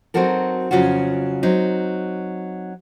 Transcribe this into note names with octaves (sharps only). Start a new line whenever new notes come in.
F#3 C4 D#4 F#4 A4 A#4
F2 C#3 F#3 F4 F#4
F#3 C4 D#4